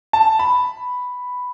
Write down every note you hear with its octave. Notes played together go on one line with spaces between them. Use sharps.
A5
B5